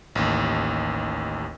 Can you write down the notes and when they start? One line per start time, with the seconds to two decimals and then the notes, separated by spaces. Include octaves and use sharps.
0.15 A1 D#2